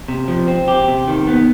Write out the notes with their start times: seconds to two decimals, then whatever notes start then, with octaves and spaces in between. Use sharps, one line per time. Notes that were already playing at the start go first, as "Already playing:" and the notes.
0.08 C3
0.28 F3
0.48 C4
0.68 G4
0.88 C3
1.08 D#3
1.27 B3